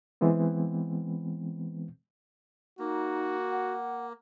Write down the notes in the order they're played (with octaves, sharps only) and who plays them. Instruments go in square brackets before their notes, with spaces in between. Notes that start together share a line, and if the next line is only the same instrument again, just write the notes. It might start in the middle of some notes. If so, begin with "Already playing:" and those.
[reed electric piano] E3 G#3 B3 C4
[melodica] A#3 [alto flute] D#4 [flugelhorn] F#4
[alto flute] F#5